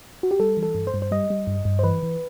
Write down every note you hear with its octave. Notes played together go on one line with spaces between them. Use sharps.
F#4
G4
G3 A4
E3
A4
G2
C5
G2
C5
G3 D#5
G3
G2
G2
C5
E3 B4
E3